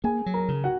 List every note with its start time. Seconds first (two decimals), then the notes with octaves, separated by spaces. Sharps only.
0.04 A#3 G#4 G#5
0.26 F#3
0.34 A#4 A#5
0.48 C#3
0.64 F#4 F#5